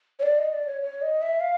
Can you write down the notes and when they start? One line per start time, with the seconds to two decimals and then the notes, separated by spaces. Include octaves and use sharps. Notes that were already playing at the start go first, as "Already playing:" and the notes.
0.19 C#5
0.23 D5
0.38 D#5
0.53 D5
0.67 C#5
0.81 C#5
1.02 D#5
1.22 E5
1.40 F5